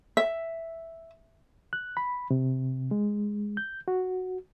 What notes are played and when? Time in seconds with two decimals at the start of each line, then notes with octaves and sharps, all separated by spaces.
0.17 E5
1.73 F#6
1.97 B5
2.31 C3
2.91 G#3
3.57 G6
3.88 F#4